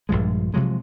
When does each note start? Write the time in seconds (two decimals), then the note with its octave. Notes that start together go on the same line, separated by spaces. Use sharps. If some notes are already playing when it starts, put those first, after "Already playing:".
0.09 A#1 G2 F3 G#3
0.54 C3 F3 F#3 G#3